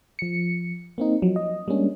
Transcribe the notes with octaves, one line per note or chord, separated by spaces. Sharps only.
F3 C#7
A#3 C4 D#4
F3 F#3
D#5
G3 G#3 A#3 C#4 D4